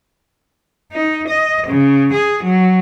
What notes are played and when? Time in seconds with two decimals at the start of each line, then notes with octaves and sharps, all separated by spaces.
0.92 D#4
1.28 D#5
1.67 C#3
2.13 G#4
2.43 F#3